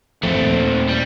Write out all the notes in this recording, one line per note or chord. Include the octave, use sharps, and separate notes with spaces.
F2 A2 F3 A3 C4
D#2 A#2
G3